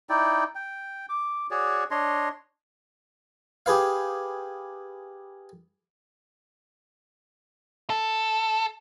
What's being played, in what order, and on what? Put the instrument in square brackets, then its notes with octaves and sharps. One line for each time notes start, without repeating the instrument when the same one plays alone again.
[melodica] D#4 E4 D5 G5
G5
D6
F#4 G#4 C#5 D5
D4 C#5 D#5 C6
[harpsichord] G4 G#4 B4 F5
[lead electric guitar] A4